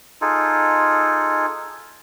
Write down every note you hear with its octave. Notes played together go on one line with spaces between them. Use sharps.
D#4 F4 G#4 A4